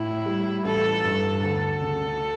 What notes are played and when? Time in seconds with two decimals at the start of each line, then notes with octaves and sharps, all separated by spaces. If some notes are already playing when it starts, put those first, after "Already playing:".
Already playing: A2 E4
0.26 G3
0.65 A1 A4
1.04 G2
1.42 D2 A4
1.82 C#3